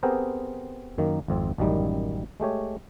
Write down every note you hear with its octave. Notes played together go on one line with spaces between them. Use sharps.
B3 C4 G4 G#4 A#4 C5
F#2 D#3 A#3
G#1 F2 C4
A1 F#2 D#3 G3 D#4
G#3 A3 G4 C#5